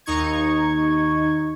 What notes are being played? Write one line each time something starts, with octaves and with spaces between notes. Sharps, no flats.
D#2 D#4 C#6 G#6